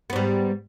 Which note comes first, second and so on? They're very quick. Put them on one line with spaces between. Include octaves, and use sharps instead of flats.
B3 G#2 G3